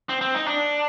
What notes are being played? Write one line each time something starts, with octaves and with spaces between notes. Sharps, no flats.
C4
C4
D#4
D4